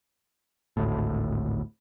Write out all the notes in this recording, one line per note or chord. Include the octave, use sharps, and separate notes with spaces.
G#1 D2 A2